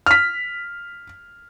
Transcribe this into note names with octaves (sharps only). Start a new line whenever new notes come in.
F6 B6